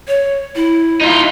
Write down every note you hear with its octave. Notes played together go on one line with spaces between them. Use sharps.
C#5
E4
D#4 F4